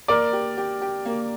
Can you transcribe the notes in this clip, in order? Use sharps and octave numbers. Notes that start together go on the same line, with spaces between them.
A#3 A#4 D5
G4
G4
G4
A#3